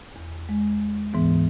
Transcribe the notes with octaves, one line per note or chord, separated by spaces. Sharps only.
E2
G#3
D2 G#2 E3 B3